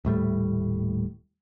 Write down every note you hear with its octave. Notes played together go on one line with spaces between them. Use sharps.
D#1 A2 G3 A3